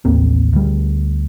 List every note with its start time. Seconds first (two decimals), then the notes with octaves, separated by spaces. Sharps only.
0.05 A1 D#2 A#3 C4
0.53 D2 G3